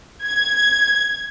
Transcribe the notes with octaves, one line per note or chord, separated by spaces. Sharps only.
G#6